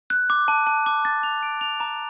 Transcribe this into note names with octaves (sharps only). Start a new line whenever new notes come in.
F#6
D6
A5
A5
D6
A6
F7
D7
F7
A#5